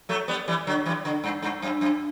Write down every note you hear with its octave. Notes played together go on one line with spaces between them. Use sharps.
F#3 A3
G3 B3
E3 G3
D3 F#3
E3 G3
D3
G2
G2
F#2
F#2